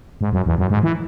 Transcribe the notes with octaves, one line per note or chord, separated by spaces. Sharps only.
G#2
F#2
E2
F#2
G#2
E3